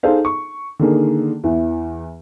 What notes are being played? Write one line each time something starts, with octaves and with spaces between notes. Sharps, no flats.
D#4 G#4 A4 C5 F5
C#6
D3 D#3 A#3 G#4
E2 E3